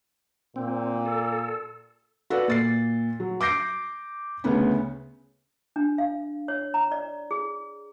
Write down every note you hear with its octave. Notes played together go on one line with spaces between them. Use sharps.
A#2 C4
A4
F#4 A4 B4 D5
A#2 A6 C7
F#3
D6 G6 A#6 C7 D7
D2 C#3 B3 C#4
D4
F5
C#5
A#5
D5
G#4